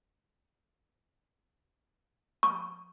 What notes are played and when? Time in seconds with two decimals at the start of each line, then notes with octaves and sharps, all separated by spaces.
2.43 C#6